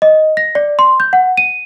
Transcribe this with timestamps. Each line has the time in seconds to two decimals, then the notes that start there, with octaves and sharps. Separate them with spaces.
0.02 D#5
0.37 A#6
0.55 D5
0.79 C6
1.00 G6
1.13 F#5
1.37 D#7